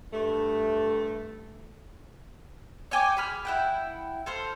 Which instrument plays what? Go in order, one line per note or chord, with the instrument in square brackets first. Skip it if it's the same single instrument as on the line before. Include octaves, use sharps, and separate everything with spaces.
[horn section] G2 A3
[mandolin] C#5 G5 G#5 D6
G#4 B5 F6
E4 F#5 G5
A4 C5 F5